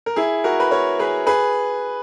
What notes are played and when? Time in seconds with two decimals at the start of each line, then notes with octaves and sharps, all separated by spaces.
0.06 A#4
0.16 E4 G#4
0.44 F#4 A#4
0.60 B4
0.71 A#4 C#5
0.99 G#4 B4
1.27 G#4 B4